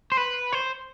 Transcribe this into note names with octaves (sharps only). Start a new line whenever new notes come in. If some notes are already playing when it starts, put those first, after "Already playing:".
C5
B4
C5